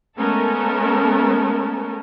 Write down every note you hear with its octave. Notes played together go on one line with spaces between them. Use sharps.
G#3 A3 B3 C#4 A4 A#4